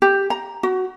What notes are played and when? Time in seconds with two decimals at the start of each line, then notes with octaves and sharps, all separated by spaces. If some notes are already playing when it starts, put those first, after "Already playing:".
0.02 G4
0.30 A#5
0.63 F#4